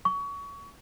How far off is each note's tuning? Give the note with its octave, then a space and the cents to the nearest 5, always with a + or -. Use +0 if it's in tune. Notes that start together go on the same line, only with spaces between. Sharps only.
C#6 +25